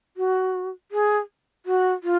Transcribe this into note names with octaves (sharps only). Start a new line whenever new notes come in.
F#4
G#4
F#4
F4